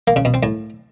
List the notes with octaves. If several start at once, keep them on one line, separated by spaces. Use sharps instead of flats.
A#3
C#3
B2
C4
A2